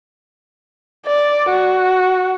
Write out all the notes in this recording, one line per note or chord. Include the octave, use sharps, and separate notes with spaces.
D5
F#4